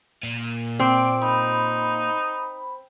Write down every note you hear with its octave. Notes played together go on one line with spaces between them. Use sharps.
A#2
C4 D5
D#4 B5